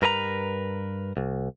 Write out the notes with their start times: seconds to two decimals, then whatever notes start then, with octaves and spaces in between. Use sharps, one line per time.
0.02 G2 A#4 B4 D#5 A#5
1.17 C2